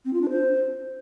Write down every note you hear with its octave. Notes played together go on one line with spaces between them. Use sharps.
C4
F4
D4
C5